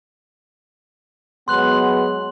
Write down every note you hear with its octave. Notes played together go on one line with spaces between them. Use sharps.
F#3 G#3 B3 C6 F#6 F#7